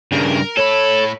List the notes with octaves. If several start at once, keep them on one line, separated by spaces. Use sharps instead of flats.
G2 C#3 A#4
A2 A4 C#5 B5